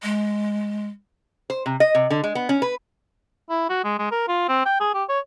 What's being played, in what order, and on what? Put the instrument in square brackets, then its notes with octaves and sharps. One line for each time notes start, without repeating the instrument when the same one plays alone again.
[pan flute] G#3
[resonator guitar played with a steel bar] C5
C3
D#5
C3
D3
G#3
B3
C#4
B4
[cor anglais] E4
F#4
G#3
G#3
A#4
F4
C4
G5
G#4
G4
C#5